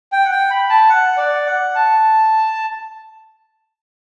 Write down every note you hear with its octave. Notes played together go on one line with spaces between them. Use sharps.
G5
F#5
G5
B5
A5
F#5
D5
F#5
A5